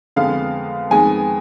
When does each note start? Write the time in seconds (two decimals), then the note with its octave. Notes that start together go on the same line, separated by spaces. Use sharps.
0.16 F2 D3 G#3 B3 F5
0.90 F2 D#3 G#3 B3 G#5